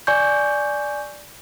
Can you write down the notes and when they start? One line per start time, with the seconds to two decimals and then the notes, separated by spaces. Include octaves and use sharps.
0.07 D5 G#5 C#6 G6